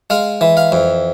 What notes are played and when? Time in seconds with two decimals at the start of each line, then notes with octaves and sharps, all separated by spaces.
0.10 G#3 F5
0.41 E3
0.57 F5
0.72 F2